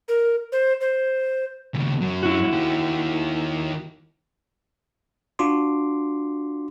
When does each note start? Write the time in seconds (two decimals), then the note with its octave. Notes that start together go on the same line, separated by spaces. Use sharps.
0.08 A#4
0.52 C5
0.81 C5
1.74 D#2 C#3
2.01 F#2 F#3
2.23 E4 F#4
2.52 D#3 G4
5.39 D4 F4 F#4 C6 D6